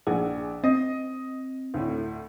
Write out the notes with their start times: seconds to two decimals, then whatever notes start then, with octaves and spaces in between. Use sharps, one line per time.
0.07 A#1 G#4 F#5
0.64 C4 D#5
1.74 D2 A2